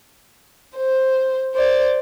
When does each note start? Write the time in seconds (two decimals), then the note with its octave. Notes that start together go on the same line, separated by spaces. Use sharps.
0.77 C5
1.54 C5 D5